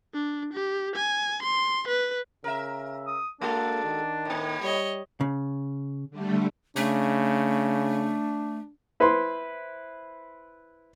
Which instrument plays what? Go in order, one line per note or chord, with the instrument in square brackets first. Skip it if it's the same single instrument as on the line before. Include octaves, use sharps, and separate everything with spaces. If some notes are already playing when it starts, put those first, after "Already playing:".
[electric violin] D4
G4
G#5
C6
B4
[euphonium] C#3 [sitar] A#4 E5
[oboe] D#6
[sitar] G#3 F#4 A4 [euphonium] A#3 [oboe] D4
[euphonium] D#3
[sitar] A2 A#3
[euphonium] G3 [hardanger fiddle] C#5 D#5
[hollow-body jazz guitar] C#3
[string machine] D3 G3 A3
[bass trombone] C#3 [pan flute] A3 [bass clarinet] D4
[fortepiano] E4 B4 C5 E5 B5 C6